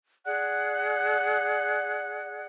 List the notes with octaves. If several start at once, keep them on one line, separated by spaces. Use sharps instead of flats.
G#4 D5 F#5 F#6